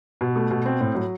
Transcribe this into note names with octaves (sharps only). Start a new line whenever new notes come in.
B2
A3
B2
C4
A2
F#3